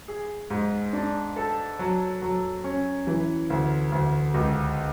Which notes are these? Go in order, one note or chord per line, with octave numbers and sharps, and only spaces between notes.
G#4
G#2
D4
A4
F#3
F#3
C#4
E3
D2
D2
C#2